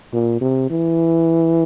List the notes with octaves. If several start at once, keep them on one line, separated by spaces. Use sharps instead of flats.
A#2
C3
E3